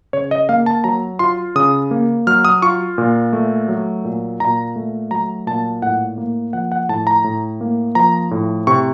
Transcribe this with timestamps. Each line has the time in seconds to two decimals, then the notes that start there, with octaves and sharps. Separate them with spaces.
0.13 C#3 C#5
0.31 D#5
0.49 A#3 F5
0.66 A5
0.84 F#3 A#5
1.19 F4 C6
1.55 C#3 D#6
1.91 A#3
2.27 F#3 F6
2.45 D#6
2.62 F4 C#6
2.98 A#2
3.33 A3
3.69 F#3
4.05 A#2
4.40 A#2 A#5
4.76 A3
5.11 F#3 A#5
5.47 A#2 A5
5.82 A2 F#5
6.18 A#3
6.53 F3 F#5
6.72 F#5
6.89 A2 A5
7.07 A#5
7.24 A2
7.61 A#3
7.95 F3 A#5
8.31 A2
8.67 C3 C#6